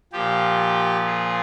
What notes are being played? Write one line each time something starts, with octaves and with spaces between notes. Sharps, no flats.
A#2 F3 G4
G#4